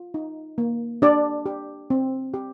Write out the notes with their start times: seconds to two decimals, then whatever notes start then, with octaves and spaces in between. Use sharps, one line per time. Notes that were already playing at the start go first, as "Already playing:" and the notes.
Already playing: F4
0.14 D#4
0.58 A#3
1.02 D4 G4 D5
1.46 G4
1.90 C4
2.34 G4